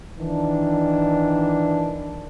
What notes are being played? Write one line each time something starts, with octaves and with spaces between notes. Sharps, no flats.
D#3 E3 D4